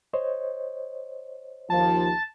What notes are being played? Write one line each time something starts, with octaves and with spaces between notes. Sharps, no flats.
C5 C#5 D#5
D#2 F3 A5